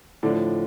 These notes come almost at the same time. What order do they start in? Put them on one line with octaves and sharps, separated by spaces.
A2 D3 D4 F3